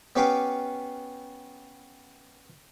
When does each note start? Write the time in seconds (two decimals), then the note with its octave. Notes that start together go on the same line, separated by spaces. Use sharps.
0.16 B3 C#4 G4 B4 F5 D6